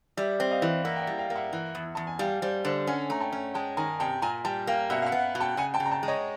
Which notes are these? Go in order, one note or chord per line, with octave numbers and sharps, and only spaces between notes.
G3 D5 E5
C4
D#5 F5
E3
A#3 E5 F#5
G5
E5 F#5
G3
F5 G5
A#3
E5 F#5
E3
E2
E2 A5
G#5
G3 F5 G5
G3 C5 D5
D3 C5 D5
C#4 F#5 G#5
A3 A#5
G5 A5
C#4
G#3 G5 A5
D#3 G#5 A#5
C3 G5 A5
A#2 G#5 A#5
G3 G5 A5
A#3 F5 G5
B2 E5 F#5
F5
E5 F#5
B3
B2
G5 A5
C#3 F#5 G#5
G5 A5
C#3
A#5
G5 A5
G#3
C#5 D#5